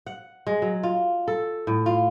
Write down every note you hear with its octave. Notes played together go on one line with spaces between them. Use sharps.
F#5
G#3
F#3
F4
A4
A2
F4